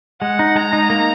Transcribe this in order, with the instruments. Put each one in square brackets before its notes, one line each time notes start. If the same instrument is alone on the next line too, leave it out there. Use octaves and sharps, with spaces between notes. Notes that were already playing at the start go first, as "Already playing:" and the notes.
[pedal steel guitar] G#3 [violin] F#5
[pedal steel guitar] D#4
[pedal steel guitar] G#3 [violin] A#5
[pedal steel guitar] D#4
A#3